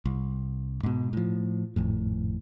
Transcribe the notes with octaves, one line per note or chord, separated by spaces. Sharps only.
C2
G#2 B2
A2 F3
G#1 F2 A2